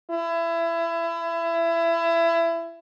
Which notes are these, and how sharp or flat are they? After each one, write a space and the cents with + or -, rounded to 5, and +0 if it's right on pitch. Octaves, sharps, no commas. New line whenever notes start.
E4 +25